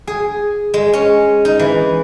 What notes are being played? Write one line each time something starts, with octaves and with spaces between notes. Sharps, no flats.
G#4
G#3
C#4
D#4
E3